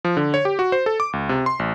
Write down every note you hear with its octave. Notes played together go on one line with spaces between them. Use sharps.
F3
D3
C#5
G4
F#4
C5
A4
D6
C#2
C3
C6
A1